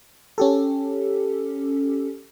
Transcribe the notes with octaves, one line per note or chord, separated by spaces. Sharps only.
C#4 G4 A4